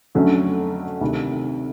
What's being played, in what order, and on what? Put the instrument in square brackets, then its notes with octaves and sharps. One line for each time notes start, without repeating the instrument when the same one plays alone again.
[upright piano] F2 D3 F#3 A3 C#4
D2 C3 D#3